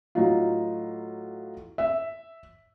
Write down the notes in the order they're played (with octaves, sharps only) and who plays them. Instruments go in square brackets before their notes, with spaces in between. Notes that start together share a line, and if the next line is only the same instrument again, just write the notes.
[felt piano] A2 F#3 D#4 F4
E5